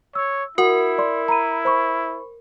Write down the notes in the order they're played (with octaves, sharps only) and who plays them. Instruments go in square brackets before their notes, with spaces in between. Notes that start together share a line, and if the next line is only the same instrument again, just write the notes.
[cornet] C#5 [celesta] E6
[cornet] E4 [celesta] F#4 F#5 [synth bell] A#4
[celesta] D5 C6
A#5 B5 D#7
C5 B5 C#6